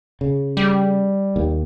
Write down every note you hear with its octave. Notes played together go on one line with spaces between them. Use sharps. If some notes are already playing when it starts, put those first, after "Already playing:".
C#3
G3
D#2